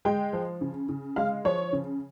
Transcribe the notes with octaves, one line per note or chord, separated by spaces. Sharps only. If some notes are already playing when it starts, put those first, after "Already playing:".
G#3 G5
F3
C#3
C#3
G#3 F5
F3 C#5
C#3